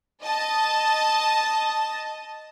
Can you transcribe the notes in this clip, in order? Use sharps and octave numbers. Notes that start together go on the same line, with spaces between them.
D#5 A5